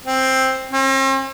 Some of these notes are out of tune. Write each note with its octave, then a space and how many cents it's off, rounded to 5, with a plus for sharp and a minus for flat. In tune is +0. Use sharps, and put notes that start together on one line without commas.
C4 +5
C4 +45